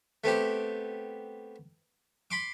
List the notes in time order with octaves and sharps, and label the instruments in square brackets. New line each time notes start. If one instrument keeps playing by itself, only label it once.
[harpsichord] A3 B3 C4 G4
B5 C6 D6